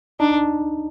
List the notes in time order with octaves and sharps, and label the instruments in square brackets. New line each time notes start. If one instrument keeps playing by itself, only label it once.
[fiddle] D4 [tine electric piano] D#4